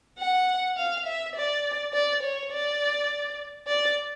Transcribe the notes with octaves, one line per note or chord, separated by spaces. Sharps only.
F#5
F5
E5
D5
D5
C#5
D5
D5